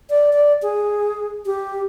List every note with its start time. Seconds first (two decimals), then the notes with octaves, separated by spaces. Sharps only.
0.10 D5
0.33 D5
0.62 G#4
1.46 G4